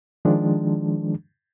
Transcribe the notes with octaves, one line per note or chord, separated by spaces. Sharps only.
D#3 F3 G#3 D4